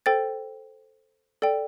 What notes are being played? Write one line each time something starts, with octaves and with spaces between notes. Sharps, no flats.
A4 C5 G5 A6
A4 D5 G5